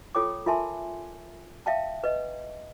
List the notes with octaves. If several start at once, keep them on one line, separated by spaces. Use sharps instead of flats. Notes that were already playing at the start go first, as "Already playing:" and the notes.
F4 A4 C#5 G5 D6
F4 A#4 E5 G#5 A5 C6
E5 F5 G5 A5
B4 D#5